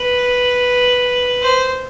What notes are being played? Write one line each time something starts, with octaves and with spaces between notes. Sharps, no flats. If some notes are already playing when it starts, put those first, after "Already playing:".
Already playing: B4
C5